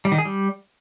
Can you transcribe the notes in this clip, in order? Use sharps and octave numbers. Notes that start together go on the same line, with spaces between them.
G3
D#3
G#4
G3